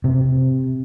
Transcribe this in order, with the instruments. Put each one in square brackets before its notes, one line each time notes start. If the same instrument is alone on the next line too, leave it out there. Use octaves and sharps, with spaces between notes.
[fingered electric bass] C3